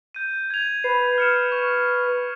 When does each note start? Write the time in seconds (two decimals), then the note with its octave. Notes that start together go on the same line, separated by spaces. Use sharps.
0.15 G6 D#7
0.50 G#6 F7
0.84 B4 C7
1.18 F6 C#7 E7
1.52 C#6